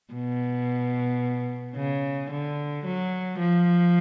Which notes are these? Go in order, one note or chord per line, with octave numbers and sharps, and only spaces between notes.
B2
C#3
D3
F#3
F3